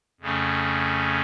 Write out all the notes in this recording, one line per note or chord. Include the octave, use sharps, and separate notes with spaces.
F2 C#3 A3 C#4